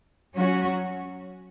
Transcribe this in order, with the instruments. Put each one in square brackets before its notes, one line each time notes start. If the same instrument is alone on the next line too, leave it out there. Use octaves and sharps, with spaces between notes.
[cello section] F#3 C#4 F#4